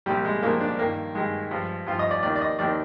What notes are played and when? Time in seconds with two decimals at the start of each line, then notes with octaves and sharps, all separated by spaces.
0.06 C2 A#2 F3 G3
0.24 G#3
0.43 C2 A#2 F3 A#3
0.60 D4
0.79 G2 D#3 A#3
1.15 G2 D#3 G#3
1.51 G2 F3
1.87 G2 F3 F4
1.99 D#5
2.11 D5
2.23 D#2 D#3 D5
2.36 D5
2.41 D#5
2.59 D#2 D#3 D5